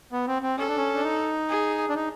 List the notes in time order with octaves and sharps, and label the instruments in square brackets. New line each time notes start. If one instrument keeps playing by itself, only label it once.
[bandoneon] B3
C4
C4
[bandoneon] C#4 [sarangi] A4
[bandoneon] D4
C#4
D4
D#4
[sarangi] G#4
[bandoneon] D4
D#4